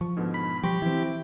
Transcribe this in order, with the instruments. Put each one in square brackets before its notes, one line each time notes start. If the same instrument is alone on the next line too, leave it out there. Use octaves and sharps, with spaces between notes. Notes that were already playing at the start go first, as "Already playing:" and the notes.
[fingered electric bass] F3 [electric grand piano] C#6
[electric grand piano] G#2 B2 D3
[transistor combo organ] B5
[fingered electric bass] F3 G3 [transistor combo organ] G4 [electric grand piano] C6 C#6 A#6
[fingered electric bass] E3 [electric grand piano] C4 E4